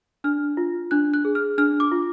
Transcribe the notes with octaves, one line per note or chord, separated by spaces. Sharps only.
D4 F6
F4
D4 F#6
F#6
G#4
F6
D4 F6
D6
F4